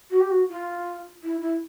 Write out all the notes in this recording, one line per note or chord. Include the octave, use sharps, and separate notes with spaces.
F#4
G4
F#4
F4
E4
E4